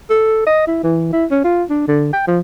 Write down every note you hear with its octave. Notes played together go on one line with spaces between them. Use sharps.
A4
D#5
E4
E3
E4
C#4
F4
D4
D3
G5
F3